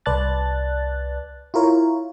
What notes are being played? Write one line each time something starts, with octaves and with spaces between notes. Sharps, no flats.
C2 B4 D5 A5 F#6 A6
E4 F4 A#4 C#5